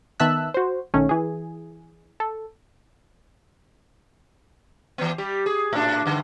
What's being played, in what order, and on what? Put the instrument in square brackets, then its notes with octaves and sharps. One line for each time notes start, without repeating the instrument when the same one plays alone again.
[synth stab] D#3 B3 E5 A5 E6 F#6
F#4 C5
B1 D#3 A3 C#4
E3 G#4
A4
[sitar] E3 B3
G3 G4
G#4
A2 D4
G2 D3